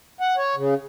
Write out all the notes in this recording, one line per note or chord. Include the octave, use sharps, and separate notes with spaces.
F#5
C#5
C#3